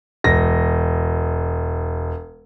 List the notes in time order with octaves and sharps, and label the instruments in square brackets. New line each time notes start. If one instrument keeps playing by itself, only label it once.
[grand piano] E1 A#6